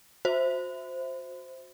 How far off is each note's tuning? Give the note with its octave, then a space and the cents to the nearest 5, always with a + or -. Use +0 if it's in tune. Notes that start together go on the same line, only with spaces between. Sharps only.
F#4 -30 C5 +0 E5 +0